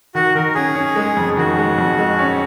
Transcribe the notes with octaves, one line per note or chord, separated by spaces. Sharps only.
D#3 F#4
D#3 A#4
C#4 G#4
C#4
G#3
F2
D#3 F#4
G#3
F2
G#3
C#4